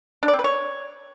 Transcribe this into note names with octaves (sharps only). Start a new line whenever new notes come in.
D4
D5
C4
B4
C#5